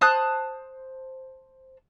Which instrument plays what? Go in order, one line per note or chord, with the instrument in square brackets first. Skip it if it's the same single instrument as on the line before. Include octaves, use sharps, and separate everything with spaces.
[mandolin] C5 A5 D#6 F#6